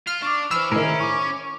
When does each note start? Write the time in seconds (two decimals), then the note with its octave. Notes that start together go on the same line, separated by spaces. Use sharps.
0.07 F4 F6
0.22 D4 C#6 D6
0.51 E3 C5 B5 E6 F6
0.72 A2 D#3 C#4 E4 G#4 A#4
1.00 C#6 D6